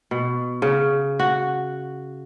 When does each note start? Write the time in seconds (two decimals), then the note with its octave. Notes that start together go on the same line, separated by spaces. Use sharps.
0.11 B2
0.62 C#3
1.19 F#4